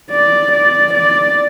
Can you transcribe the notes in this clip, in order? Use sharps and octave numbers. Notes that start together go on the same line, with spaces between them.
D5
D5
D5